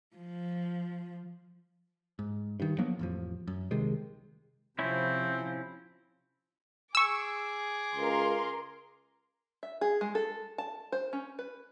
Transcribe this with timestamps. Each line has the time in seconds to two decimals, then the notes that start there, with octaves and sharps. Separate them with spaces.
0.16 F3
2.19 G#2
2.60 G2 D#3
2.78 F3 F#3 A#3 B3
2.99 A1 F2 F3
3.48 F#2
3.71 C2 C3 D#3 G#3
4.79 C3 F3 C4 C#4 E4
6.95 G#4 C#6 D6 E6
7.95 C#2 A#4 C6
9.63 E5
9.81 G#4
10.01 G#3
10.15 A4
10.58 A5
10.92 C5
11.13 C#4
11.39 B4